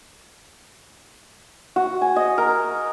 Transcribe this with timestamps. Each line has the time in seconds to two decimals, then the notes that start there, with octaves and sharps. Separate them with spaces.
1.76 F#4
2.01 G#5
2.16 D#5
2.38 A#4